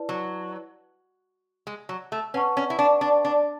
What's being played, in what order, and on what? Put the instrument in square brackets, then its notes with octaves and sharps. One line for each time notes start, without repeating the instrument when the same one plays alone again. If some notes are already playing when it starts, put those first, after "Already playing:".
Already playing: [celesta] E4 B4 D5 A5
[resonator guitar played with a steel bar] F#3
G#3
F#3
A3
[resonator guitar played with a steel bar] C#4 [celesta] B4 F#5 A5 C#6
[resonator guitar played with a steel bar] C#4
E4
D4
D4
D4